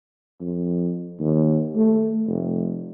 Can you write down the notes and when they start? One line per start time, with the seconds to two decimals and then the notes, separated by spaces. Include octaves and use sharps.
0.41 F2
1.19 D#2
1.76 A3
2.27 F1